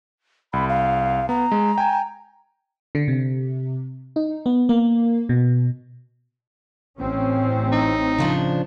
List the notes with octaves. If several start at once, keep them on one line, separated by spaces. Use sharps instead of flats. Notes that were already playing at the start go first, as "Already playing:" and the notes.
C2 B5
F5
B3 A#5
G#3
G5 G#5
D3
C3
D#4
B3
A#3
B2
A1 C4 C#4
D#4
C#3 F3 D4